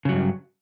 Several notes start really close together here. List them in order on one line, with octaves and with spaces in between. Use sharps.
C#3 F#3 G2